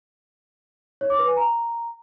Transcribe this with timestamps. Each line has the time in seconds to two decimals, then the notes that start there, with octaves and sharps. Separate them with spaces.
1.01 C#5
1.10 D6
1.19 B4
1.28 G#5
1.37 A#5